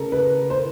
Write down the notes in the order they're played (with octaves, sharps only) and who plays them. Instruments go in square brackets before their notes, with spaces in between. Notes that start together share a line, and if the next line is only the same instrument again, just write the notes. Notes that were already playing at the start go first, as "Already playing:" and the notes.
Already playing: [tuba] C#3 [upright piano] A4 A#4
[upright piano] B4
C5